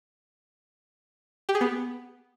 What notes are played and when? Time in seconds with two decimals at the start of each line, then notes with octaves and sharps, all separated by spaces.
1.49 G4
1.55 G#4
1.61 B3